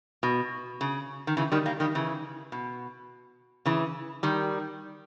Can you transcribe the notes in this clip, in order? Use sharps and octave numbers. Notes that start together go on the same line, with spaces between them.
B2
C#3
D#3
C#3 E3
D#3 G3
G3 A#3
D#3 G3
C#3 E3
B2
C#3 E3
D#3 G3